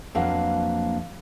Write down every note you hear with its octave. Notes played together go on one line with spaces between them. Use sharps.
F2 F#3 A#3 D4 B4 F5